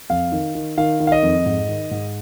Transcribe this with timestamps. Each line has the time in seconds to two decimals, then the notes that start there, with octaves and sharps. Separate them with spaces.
0.10 F2 F5
0.32 D#3
0.55 D#3
0.78 D#3 F5
1.00 D#3
1.07 F5
1.12 D#5
1.23 F2
1.45 G#2
1.68 D#3
1.91 G#2